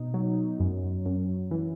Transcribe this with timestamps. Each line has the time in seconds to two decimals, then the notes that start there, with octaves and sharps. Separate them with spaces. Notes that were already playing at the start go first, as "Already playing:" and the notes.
Already playing: B2 D#4
0.14 F#3
0.60 F#2
1.06 F#2
1.51 E3